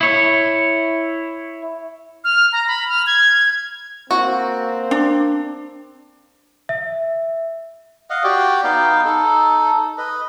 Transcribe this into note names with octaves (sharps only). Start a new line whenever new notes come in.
E4 C#5
F6
A#5
B5
F6
G#6
A#3 C4 F#4
D4
E5
D#5 F5 F#5
F#4 G4 D5
B3 D#4 F5 G5
D#4 A4
B4 D#5